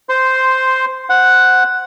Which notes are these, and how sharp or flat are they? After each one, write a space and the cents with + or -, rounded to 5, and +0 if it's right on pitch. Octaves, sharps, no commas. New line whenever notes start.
C5 -5 C6 +0
C5 +0 F#5 +0